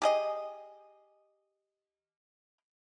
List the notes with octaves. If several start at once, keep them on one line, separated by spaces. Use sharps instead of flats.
G4 G#4 D#5